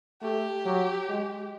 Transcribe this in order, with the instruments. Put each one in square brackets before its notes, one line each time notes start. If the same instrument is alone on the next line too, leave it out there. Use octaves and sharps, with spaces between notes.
[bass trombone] A3 [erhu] G4
[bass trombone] F#3
G#3